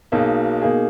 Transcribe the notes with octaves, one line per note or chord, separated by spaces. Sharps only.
B1 B2 A#3 D#4 G#4
B2 A#3 D#4 G#4